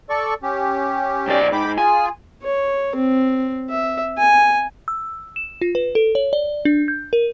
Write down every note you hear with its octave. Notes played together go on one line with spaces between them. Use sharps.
A4 D5 C#6
C#4 G4
B1 D5
G#2 G5 B5 D6
F4 G#4 G#5
C#5
C4
E5
G#5
E6
E7
F4
B4
A4
C#5
D5
D4
G6
A#4